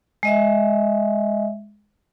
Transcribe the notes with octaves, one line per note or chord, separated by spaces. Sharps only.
G#3 D#5 E5